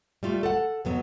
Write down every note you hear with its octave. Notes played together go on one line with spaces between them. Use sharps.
G3 A3 F4
A4 F#5
F2 F#3 B3